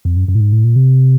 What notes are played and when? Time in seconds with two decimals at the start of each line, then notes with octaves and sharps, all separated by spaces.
0.05 F2
0.16 F#2
0.28 F#2
0.35 A2
0.40 G#2
0.52 A2
0.64 A#2
0.76 C3